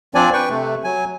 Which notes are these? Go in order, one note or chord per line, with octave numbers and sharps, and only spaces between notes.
F3 C4 D4 D5 G#5
B4 G5 C#6
C3 A3
F#3 G#5